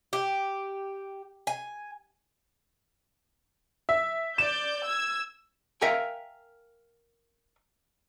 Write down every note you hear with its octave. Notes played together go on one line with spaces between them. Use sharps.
G4
G#5
E5
D5 G6 E7
E6 G#6
A#4 E5 F5 G5 G#5